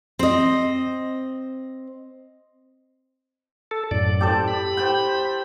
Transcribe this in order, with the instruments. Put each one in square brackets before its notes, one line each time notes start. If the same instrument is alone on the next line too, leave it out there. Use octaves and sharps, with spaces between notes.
[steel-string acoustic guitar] C4 D#5
[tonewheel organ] A4
F#2 A2 D5
[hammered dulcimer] G4 A4 C5
[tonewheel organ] B5
[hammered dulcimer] C5 G5